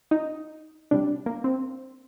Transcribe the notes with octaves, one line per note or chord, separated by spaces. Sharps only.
D#4
C3 G3 D4
A#3
C4